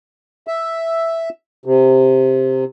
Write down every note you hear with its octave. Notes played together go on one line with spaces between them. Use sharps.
E5
C3